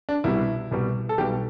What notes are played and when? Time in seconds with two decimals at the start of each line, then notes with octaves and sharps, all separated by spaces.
0.09 D4
0.24 C2 B2 G3 E4
0.71 C2 B2 G3
1.09 A4
1.18 B1 B2 G3 G4